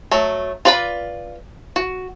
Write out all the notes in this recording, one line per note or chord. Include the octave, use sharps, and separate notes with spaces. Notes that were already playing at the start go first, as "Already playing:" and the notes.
F#3 A3
F4 B4 D5 F5 B5
F#4